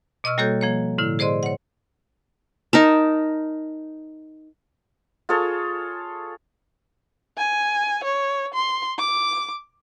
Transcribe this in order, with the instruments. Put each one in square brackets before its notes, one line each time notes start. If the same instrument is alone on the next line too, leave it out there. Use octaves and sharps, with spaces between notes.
[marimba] B2 D#5 C#6 E6 F6
G3 A#3 F#4 A4 C#5 G6
F3 A#3 C#5
A2 D3 E4
G#4 C5 D5 D#5 C6
C#5 F#5
[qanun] D#4 A#4 A5
[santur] F4 G#4 A4 C#5
[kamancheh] G#5
C#5
C6
D6